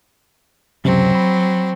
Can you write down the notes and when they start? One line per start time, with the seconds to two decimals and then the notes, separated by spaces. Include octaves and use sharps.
0.85 C#2 F#2 C3 F#3 C4
1.15 B5